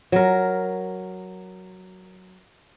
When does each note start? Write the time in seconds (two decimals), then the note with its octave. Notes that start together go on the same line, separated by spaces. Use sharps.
0.12 F#3 A#4